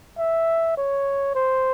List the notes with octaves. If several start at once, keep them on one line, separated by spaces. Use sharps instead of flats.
E5
C#5
C5